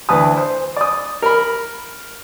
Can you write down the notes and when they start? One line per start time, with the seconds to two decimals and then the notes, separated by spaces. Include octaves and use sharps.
0.09 D2 E3 E4 B4 A5 D#6
0.38 C5
0.77 D5 D#6
1.22 A#4 B5